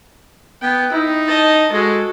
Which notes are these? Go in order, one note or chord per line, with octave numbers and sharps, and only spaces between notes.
B3 G5
D#4 E4
D#5 A5
G#3 F#4 A4